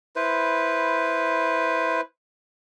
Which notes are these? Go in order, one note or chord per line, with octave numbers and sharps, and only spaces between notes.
E4 B4 C5